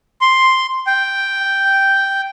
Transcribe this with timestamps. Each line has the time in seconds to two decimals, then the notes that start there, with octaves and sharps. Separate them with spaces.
0.21 C6
0.87 G5